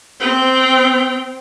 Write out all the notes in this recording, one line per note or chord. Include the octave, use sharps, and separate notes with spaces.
C4 G5